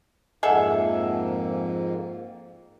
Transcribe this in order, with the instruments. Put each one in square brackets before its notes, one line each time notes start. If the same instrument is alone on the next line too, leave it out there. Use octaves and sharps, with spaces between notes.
[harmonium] F2 G#2 A#3 [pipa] G#4 A4 E5 [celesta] D#5 F#5